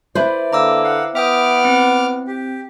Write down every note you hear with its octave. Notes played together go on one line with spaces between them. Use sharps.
E4 B4 C5 D5
D3 A#3 A#5 D6 E6
F5 F#5
B3 E5 G5 D6 D#6 F6
C4
G4